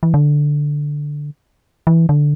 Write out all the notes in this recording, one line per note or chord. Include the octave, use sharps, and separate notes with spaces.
E3
D3
E3
D3